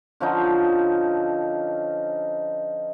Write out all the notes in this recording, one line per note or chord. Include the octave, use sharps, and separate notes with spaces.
D3 F3 C#4 D#4